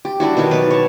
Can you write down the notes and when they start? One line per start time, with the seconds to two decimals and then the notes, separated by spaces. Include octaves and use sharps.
0.05 G4
0.20 G3 D4 E4 F#4
0.37 B2 D#3 F#4 C#5
0.51 F#3 B4 D5
0.70 C#5 A5